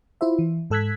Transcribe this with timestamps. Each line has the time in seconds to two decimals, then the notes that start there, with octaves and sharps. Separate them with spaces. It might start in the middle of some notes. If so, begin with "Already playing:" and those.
0.21 E4 F4 C5 E5
0.39 E3
0.70 G#2 A4 E6 F#6 G#6 B6